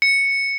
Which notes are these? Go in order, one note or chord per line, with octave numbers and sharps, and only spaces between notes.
C#7